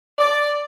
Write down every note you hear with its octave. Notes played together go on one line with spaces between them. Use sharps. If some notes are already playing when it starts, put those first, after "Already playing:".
D5